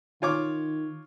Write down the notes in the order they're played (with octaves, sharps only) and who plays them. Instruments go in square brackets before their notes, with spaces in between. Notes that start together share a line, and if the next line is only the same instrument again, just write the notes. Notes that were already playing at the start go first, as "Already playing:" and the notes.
[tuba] D#3 [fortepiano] F4 C#5 D6